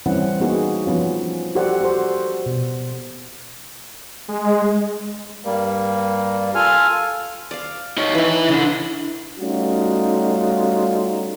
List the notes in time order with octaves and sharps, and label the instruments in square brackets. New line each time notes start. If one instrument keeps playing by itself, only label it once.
[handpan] E3 G3 C4 C#4 E4 F#5
A#3 B3 D#4 F#4 G#4
F3 B3 C#4 F4
F#4 G4 A4 C5 D5 F#5
F#4 A4 C5
B2
[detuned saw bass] G#3
[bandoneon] G2 G3 A#3
F4 A4 G#5 F6
[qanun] D5 F5
[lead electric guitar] D#4 C#5
[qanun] E3 D#4 [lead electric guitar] B4 E5
[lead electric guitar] C#3 D4 [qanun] E4
[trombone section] G3 A3 C#4 D#4 F4 F#4